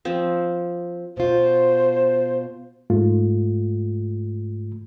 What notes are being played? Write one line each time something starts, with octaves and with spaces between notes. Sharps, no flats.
F3 C4
B2 F4 C5
G#2 A3 F4